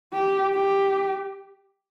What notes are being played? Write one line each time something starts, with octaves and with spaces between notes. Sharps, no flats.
G4
G4